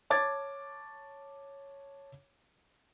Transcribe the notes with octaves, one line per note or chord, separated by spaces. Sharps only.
C#5 A5 D6 G#6 A6